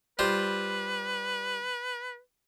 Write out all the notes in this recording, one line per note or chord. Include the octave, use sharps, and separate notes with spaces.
G3 F4 B4 C5